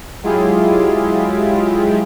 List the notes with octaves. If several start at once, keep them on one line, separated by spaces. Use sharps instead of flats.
F#3 G#3 E4 F4 G4 G#4